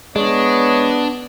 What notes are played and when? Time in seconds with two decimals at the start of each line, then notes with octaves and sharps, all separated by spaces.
0.16 G#3 B3 D4 C#5 D#5